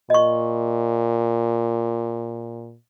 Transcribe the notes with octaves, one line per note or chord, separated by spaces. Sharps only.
A#2 D#5 C#6